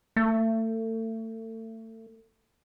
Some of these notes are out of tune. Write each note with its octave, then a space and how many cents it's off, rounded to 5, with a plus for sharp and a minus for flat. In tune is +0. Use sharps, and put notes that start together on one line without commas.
A3 +30